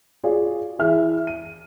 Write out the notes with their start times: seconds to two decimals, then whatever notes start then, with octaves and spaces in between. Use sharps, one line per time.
0.24 F4 F#4 G#4 D5
0.79 E3 G#4 E5 F6
1.27 D#7